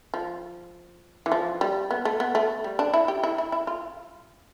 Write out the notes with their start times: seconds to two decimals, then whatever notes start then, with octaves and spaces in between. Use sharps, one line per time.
0.14 F3
1.26 E3
1.32 F3
1.61 G3
1.91 B3
2.05 A3
2.20 B3
2.35 A3
2.64 G3
2.79 D4
2.94 E4
3.08 G4
3.23 E4
3.38 E4
3.52 E4
3.67 F4